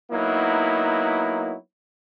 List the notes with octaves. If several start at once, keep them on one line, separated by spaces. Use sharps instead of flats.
F#3 A#3 B3 D#4 E4